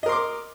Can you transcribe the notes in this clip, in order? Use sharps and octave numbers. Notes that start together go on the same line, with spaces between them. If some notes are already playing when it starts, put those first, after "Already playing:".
A#4 D#5 C6 D6